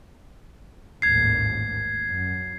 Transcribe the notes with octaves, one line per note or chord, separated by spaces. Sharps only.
A1 D#2 G#2 G#6 C7
F#2